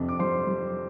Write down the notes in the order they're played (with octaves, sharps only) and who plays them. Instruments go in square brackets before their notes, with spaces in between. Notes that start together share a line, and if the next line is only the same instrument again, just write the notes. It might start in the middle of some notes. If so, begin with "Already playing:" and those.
Already playing: [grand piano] F2 C3 D4
D6
G3 C5 C6
G3